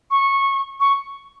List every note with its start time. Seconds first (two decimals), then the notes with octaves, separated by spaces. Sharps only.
0.11 C#6
0.80 C#6